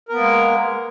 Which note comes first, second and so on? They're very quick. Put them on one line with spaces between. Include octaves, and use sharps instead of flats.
A#4 B3 A#3 G#3